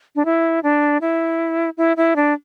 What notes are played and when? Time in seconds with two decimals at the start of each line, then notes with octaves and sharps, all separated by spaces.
0.15 D4
0.25 E4
0.63 D4
1.01 E4
1.77 E4
1.97 E4
2.16 D4